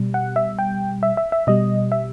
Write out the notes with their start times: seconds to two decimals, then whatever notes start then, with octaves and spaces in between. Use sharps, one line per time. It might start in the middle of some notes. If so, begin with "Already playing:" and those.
Already playing: B2 G3
0.14 F#5
0.36 E5
0.59 G5
1.03 E5
1.17 E5
1.32 E5
1.47 B2 G3 D#5
1.92 E5